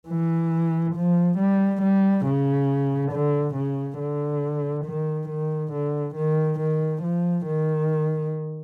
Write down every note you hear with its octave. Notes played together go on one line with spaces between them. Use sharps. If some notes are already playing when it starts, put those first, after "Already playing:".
E3
F3
G3
G3
C#3
D3
C#3
D3
D#3
D#3
D3
D#3
D#3
F3
D#3